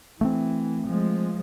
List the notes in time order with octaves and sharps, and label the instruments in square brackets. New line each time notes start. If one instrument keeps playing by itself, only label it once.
[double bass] E3 [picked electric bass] A3 A#3 C4
[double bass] F3 G#3